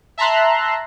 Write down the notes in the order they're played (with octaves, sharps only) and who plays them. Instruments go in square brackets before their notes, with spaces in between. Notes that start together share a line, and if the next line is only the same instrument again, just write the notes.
[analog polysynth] E5 A5 A#5 C6 F#6